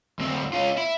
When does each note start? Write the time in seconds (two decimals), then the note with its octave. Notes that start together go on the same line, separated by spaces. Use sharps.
0.19 D2 C4
0.53 C#4 F4
0.78 E4